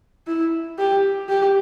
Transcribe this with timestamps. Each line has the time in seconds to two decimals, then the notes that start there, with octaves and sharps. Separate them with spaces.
0.27 E4
0.78 G4
1.29 G4